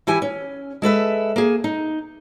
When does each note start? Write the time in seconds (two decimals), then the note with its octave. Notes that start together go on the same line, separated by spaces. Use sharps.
0.07 E3 E4 G4 G#5
0.22 C#4
0.82 G#3 A4 B4 E5
1.36 A#3 G#4
1.64 D#4